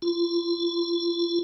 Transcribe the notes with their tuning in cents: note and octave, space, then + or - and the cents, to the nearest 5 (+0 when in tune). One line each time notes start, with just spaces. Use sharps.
F4 -35